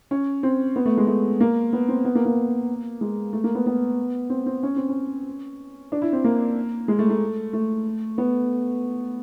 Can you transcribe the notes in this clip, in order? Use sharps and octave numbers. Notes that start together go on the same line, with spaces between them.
C#4
C4
B3
A3
G#3
A3
A#3
B3
C4
B3
A#3
A#3
G#3
A3
A#3
B3
B3
C4
C4
C#4
C4
C#4
D4
E4
C4
A#3
G#3
A3
A3
A3
B3